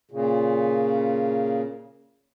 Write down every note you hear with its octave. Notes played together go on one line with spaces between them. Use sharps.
A#2 C#3